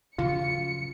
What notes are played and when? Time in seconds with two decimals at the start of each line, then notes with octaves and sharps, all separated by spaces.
0.18 C#3 F3 F#3 F4 C#7